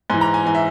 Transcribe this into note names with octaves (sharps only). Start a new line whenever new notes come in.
G#2 E3 G#5
A#5
G#5
E3 G#5
E5